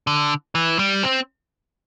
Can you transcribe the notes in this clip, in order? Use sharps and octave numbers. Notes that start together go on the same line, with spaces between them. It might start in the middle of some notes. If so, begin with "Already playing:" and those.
D3
E3
G3
C4